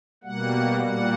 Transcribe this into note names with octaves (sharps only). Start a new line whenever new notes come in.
B2 G3 A#3 F#5
A#2 G3 A#3 F#5